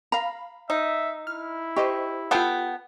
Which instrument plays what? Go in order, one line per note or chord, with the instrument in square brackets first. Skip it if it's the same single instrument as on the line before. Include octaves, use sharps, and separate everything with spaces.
[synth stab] F5 B5 [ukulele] A#5
[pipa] D#4 [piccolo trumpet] E5
[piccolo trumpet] E4 [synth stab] F6
[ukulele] G4 [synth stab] C5 D#5 C#6
[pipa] B3 A4 G5 [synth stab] F4 G6